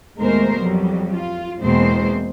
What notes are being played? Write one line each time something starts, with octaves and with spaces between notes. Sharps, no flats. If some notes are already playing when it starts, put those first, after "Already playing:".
D#2 B2 G#3 A3 A#4 C5
F2 F#3 G3
F4
E2 B2 G#3 A#3 C4 C5